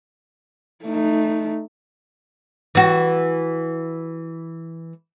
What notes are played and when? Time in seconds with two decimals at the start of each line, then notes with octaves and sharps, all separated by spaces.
0.85 A3 D#4
2.75 E3 F#4